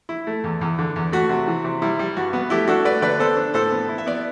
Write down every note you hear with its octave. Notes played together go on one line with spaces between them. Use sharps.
E4
A3
E2
E2
D3
E2
A3 F#4
C3
E3
C3
G3 E4
G3
G2 F#4
B3
A3 E4 G4
D4 F#4 A4
A3 B4 D5
D3 B4 D5
B3 A4 C5
D4
A2 A4 C5
B3
E4
E5
B3 D5